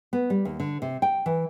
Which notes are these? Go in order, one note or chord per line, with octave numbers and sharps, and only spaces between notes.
B3
G3
D#2
D3
C3
G5
E3